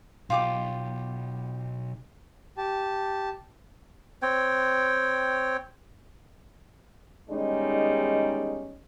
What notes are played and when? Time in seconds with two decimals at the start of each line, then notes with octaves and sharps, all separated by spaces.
0.30 B1 F4 G4 D6
2.57 G4 A5
4.22 C4 C#5 G5
7.30 E2 D#3 G3 G#3 C#4 D#4